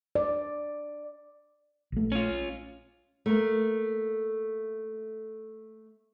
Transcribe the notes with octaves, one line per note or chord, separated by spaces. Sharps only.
D5
A#1 A3
C#4 F4
A3 A#3